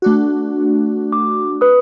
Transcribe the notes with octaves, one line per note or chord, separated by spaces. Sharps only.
A3 D4 F#4
D6
B4 D#6